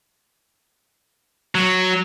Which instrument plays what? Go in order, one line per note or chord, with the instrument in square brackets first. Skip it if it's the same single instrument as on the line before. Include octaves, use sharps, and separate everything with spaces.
[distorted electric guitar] F#3